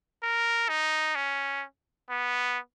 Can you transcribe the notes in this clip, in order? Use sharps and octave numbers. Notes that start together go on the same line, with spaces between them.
A#4
D#4
C#4
B3